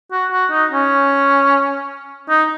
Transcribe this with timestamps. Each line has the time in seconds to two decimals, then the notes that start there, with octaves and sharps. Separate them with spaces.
0.12 F#4
0.32 F#4
0.51 D#4
0.71 C#4
2.29 D#4